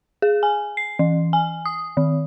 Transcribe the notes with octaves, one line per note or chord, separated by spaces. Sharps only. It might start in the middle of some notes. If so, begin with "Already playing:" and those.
G#4
G#5
C7
E3
G#5
D#6
D#3